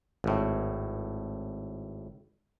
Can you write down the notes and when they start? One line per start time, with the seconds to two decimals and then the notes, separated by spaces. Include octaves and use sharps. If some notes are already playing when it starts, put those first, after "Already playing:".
0.24 G#1 A2